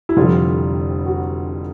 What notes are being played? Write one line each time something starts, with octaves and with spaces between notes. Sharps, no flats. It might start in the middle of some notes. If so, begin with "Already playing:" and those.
E4
F1 F2 D3 G3 F4
F#4